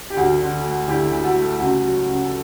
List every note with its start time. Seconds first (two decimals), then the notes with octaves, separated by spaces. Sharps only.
0.10 G4
0.17 D2 F#4
0.40 D3
0.64 A3
0.87 D2 E4 G4
1.12 D2
1.24 F#4 A4
1.36 A3
1.59 C#2 F#4
1.82 F#3
2.07 C#2
2.24 A4